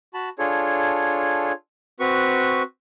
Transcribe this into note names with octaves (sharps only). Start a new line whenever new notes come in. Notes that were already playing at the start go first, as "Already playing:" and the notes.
F#4 A5 B5
D4 F4 G#4 A4 C#5
C4 F#4 B4 C#6